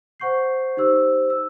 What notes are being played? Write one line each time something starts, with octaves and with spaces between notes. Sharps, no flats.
C5 F#5 C#6 G6 C7
D#4 G4 C5 E6
E6